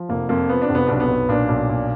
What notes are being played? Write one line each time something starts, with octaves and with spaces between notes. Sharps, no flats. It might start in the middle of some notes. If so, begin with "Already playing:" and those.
Already playing: F3
F1 A#3
F2 A#3
F3 B3
D4
F1
B3
B1 D4
B3
B1
A#2 D4
B1
A#2